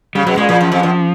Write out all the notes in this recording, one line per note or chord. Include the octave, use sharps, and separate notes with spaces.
C#3 G3
B2 F#3
A#2 G#3
A#2 F3
F#2
F2
F#2